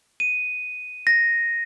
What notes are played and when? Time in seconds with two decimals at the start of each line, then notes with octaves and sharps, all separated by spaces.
0.20 D#7
1.07 A#6